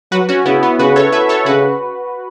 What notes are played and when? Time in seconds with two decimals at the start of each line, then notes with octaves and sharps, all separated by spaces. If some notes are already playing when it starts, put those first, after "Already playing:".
0.12 F#3 F#4 B4
0.29 C#4 F#4
0.46 C#3 B3 E4
0.63 B3
0.79 C#3 F#4 B4
0.96 A4 C#5
1.12 B4 E5
1.29 A4 C#5
1.46 C#3 F#4 B4